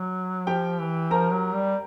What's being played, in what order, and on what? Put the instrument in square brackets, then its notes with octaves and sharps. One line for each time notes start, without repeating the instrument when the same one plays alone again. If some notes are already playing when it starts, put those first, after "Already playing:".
Already playing: [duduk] F#3
[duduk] F3 [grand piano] G4 G5
[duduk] E3
[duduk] F3 [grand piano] A#4 A#5
[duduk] F#3
G3